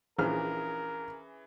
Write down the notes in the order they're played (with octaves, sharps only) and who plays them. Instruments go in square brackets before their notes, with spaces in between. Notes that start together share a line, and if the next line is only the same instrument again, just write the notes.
[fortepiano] A#1 F6 [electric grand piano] E3 C#4 G#4 [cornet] A#4